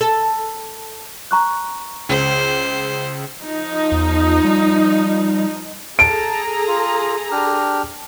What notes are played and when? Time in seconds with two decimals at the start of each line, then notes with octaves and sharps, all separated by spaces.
0.01 A4
1.31 A#5 C#6 F#6
2.09 C#2 C5
3.44 F3 D#4
3.92 E2
4.45 G3
5.99 G#4 A4 A5 A#5 D7
6.67 F4
7.32 D4 G4 F6